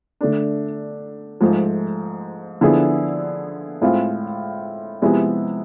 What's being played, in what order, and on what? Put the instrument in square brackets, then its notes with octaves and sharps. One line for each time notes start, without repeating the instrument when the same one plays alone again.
[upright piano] D3 A3 D4
G#2 F3 A3
D3 F3 B3 E4 G#4
A2 G#3 C4 F4
C3 F3 G#3 B3 E4